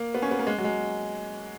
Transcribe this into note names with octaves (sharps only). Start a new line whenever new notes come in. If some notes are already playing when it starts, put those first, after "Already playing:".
Already playing: A#3
B3
C#4
B3
A#3
G#3
F#3
G#3